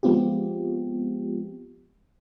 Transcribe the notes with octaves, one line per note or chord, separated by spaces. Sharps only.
F3 G#3 B3 C4 F4 G4